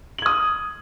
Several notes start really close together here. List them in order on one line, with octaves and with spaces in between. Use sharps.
F#7 G#6 D#6